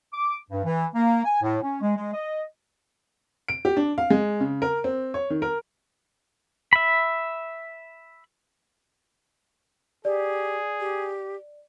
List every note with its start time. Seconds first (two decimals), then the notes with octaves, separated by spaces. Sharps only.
0.14 D6
0.51 G2
0.64 E3
0.95 A#3
1.25 G#5
1.42 A2
1.62 C#4
1.82 G#3
1.97 G#3
2.14 D#5
3.48 D7
3.65 G4
3.77 D4
3.98 F5
4.10 G#3
4.40 C#3
4.62 A#4
4.84 C4
5.14 C#5
5.30 D#3
5.42 A#4
6.73 E5 B5
10.05 G4 G#4 D5
10.80 G4